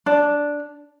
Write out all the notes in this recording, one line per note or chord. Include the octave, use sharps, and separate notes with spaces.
D4